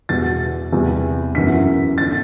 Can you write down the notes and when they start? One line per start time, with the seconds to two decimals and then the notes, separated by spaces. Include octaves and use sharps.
0.09 E2 B2 G3 B3 A6
0.72 E2 C3 G3
1.35 G1 F#2 E3 B3 B6
1.98 G1 D3 A6